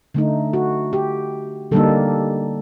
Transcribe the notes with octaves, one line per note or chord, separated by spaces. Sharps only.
D3 A3 D#4
F#4
G4
D3 G3 A#3 D#4 A4